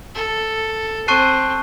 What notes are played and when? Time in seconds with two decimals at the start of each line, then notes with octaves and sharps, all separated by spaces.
0.15 A4
1.08 C4 A5 C#6 F#6 C7 D#7